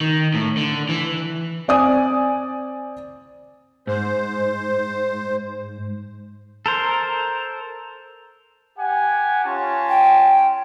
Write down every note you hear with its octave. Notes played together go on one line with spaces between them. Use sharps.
D#3
A2
D3
E3
C4 D5 G#5 D#6
G#2 C5
A4 A#4 C5
G4 F#5 G#5
C#4 F4 A5
G5